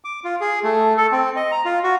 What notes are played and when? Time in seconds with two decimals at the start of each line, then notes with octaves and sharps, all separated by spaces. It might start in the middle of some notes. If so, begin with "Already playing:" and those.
0.04 D6
0.24 F4
0.41 G#4
0.64 A3
0.98 A4
1.12 C4
1.36 D#5
1.52 A#5
1.65 F4
1.84 F#4